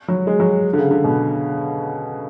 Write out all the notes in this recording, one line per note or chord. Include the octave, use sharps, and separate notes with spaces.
F#3
G#3
F#3
D3
C#3
D3
B2